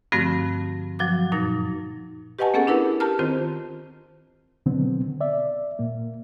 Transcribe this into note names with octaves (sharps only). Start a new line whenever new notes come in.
G2 D3 F3 A3 C4 F#4
F3 F#3 F#4 D6
F#2 A#2 D#4 A6 A#6
G4 B4 D#5 F#5 G#5 A5
A#3 B3 C#4 G#4 A4 F#5
D4 E4 A#4 B4
G4 A#4 A5 A#5 F6
D#3 C4 F4 C5
B2 D3 D#3 F#3 B3 C4
D5 E5
A#2 A#3